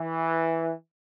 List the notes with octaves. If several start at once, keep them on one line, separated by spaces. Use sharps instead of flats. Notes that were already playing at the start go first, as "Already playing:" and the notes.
Already playing: E3